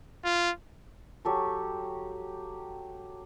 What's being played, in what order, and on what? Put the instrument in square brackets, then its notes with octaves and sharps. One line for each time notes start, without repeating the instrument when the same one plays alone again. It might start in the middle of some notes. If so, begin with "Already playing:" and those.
[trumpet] F4
[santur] F#3 G4 A4 C#6